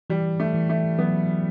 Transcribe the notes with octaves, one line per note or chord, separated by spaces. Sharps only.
E3 G3
A3
E3
A3
F#3 B3